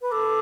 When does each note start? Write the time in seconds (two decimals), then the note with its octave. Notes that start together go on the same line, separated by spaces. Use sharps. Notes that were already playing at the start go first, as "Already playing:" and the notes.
0.02 B4
0.11 A4 D6